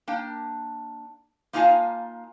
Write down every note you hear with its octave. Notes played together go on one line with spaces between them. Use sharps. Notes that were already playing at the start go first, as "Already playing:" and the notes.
A#3 D4 G5
A#3 D#4 F4 F5 G#5 A5